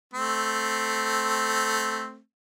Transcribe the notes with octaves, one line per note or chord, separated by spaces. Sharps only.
A3 C4